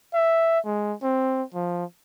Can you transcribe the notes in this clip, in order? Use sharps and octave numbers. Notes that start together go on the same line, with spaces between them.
E5
G#3
C4
F3